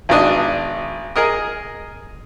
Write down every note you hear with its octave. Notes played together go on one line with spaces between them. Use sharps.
G#1 B2 D4 D#5
G#4 A#4 D#5